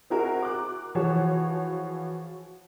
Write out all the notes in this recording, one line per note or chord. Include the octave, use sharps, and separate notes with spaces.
C4 E4 F#4 G#4 A#4
D6 F#6
E3 F3 F#4 G#4 C#5